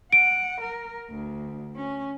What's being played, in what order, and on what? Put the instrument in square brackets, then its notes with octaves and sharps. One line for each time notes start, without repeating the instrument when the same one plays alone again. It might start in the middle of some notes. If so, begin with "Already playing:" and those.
[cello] F#5 [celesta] D7
[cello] A#4
D2
C#4